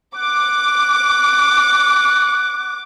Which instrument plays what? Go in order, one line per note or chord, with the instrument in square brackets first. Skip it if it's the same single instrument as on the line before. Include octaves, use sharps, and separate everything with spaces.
[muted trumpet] F#5 [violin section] D6